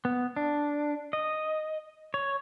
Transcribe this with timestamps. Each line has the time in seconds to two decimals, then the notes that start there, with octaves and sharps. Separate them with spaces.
0.05 B3
0.36 D4
1.13 D#5
2.14 C#5